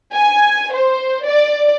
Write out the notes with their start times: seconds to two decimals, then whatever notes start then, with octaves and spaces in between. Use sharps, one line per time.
0.14 G#5
0.72 C5
1.25 D5